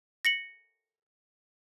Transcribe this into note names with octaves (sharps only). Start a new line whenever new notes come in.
A#6 C#7 F#7